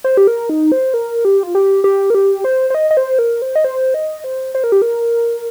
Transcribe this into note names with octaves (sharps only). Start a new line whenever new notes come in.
C5
G4
A#4
D#4
C5
A#4
G4
F4
G4
G4
A#4
G4
C5
C5
D#5
D#5
C5
A#4
C5
D#5
C5
D#5
C5
C5
A#4
G4
A#4